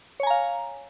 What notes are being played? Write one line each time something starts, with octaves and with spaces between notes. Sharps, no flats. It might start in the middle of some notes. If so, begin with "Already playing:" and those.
C#5 F5 G#5 A#5